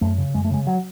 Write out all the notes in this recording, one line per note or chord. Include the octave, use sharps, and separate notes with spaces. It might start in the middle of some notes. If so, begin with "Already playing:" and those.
F#2 A3
C#3
F#2 G#3
A3
C#3 G#3
F#3